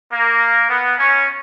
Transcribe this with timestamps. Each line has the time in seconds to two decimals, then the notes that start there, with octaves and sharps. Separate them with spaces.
0.12 A#3
0.69 B3
0.98 C#4